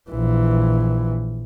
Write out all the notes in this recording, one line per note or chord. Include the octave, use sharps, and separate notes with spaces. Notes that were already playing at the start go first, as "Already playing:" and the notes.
A#1 E3